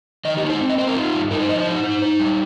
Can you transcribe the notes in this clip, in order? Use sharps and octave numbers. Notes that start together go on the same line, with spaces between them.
D#3 D#5
G4
D#4
C5
C4
D#5
C4 C5
A#4
D#4 F4
G2
D#4 A#4
C5
F3 D#5
C5
D#4
D#4
D#4
G3